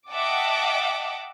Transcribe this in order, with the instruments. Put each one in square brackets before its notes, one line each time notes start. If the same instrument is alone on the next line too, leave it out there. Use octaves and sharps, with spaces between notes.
[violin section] D#5 E5 F#5 G5 A5 D6